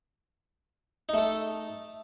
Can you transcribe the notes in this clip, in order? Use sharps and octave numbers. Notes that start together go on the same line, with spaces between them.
A3 D#4 A4